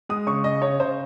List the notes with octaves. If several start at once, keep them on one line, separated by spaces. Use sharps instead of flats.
G#3 D#6
C#3 C#6
C#3 D#5
C#3 C#5
C#3 C5